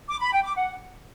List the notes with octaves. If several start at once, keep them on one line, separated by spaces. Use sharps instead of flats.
D6
B5
G5
D6
F#5